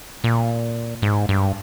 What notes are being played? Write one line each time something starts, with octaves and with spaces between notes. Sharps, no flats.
A#2
G#2
G2